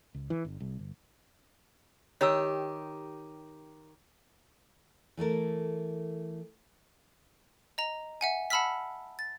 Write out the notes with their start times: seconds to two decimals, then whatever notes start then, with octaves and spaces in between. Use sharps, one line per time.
0.15 C#2
0.30 E3
0.45 G1
0.60 C2
0.79 G1
2.21 D#3 G4 C#5 E6
5.17 E3 A3 A4 A#4
7.78 D#5 A#5
8.21 E5 F#5 G#5
8.50 F#5 A5 B5 E6 F6 B6
9.19 A6